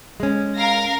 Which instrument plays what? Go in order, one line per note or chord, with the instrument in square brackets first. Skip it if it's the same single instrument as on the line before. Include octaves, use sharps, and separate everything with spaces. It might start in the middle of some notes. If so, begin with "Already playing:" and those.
[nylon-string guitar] G#3 C#4
[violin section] A#4 F5 A#6